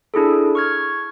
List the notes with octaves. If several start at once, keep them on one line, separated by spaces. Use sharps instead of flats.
D4 E4 G#4 A4
C#6 F6 G#6